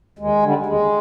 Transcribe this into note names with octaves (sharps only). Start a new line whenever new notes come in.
D#2 G#3
D3 G3
D#2 G#3